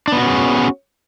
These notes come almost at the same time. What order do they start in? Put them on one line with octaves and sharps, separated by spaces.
D4 B3 F#4 C#4 G#4